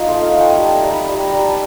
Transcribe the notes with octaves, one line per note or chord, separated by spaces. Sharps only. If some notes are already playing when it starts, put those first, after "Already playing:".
Already playing: D#4 F4
A3 C6
F5
A3 F#5
G5
G#5
G3 A5
A#5
G3
B5
G3
A#5
G3
A5